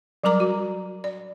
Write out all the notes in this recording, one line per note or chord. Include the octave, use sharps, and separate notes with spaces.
F#3 G3 A#4 A#5 D6
F#4
D5